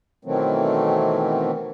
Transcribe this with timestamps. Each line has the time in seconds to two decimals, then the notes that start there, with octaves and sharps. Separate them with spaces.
0.25 B2 D#3 E3 F#3 A3 C4